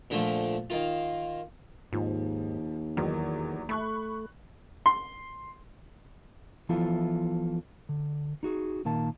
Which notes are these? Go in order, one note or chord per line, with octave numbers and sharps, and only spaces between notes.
A#2 D3 F3 A3
D#3 A#3 F4
D#2 G#2 F3
E2 D#3 E3 F#3
A3 B5 C#6 F#6
C6
E3 F3 B3 E4 F4 A4
D3
D#4 F#4 G#4
A#2 D#3 A#3 A5